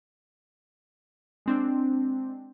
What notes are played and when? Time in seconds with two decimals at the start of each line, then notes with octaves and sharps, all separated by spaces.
1.46 G#3 C4 D4